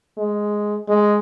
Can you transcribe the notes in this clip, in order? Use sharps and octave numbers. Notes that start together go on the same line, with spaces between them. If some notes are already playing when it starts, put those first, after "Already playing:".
G#3
G#3